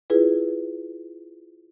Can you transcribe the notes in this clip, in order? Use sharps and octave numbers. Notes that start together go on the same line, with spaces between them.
E4 F4 G#4 B4